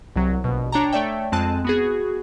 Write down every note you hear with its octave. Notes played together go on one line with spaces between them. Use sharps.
C2 F#3
A#1 B2
D4 C#5 G5 A5 A#5
A3 C#5 D5 E5 G5
F2 G#3 C4 A5 F#6 D#7
B3 F#4 G#4